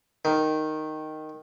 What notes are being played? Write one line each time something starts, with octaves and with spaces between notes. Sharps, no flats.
D#3